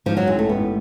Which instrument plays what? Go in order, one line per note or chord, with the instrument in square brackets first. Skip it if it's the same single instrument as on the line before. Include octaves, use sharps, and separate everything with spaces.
[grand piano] G#2 [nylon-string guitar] F3
[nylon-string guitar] F#3
[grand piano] A1 [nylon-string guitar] G#3
[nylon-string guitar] A3
[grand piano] A1 [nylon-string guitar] B3